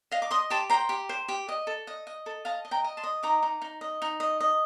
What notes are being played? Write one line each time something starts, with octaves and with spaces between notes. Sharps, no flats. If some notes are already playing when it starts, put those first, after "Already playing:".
D#5 F5
D6
D#5 C6 D#6
G4 A5 C6
C5 G5 A#5
G4
C5
G4
D#5
A4
D#5
D#5
A4
D#5 F5 A5
D#5
G5 A#5
D#5
A5 C6
D#5
D#4 A#5 D6
D#4
D#4
D#5
D#4
D#5
D#5